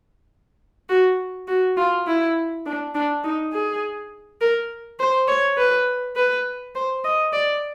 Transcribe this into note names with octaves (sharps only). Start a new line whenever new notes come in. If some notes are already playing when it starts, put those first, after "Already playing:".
F#4
F#4
F4
E4
D4
D4
D#4
G#4
A#4
C5
C#5
B4
B4
C5
D#5
D5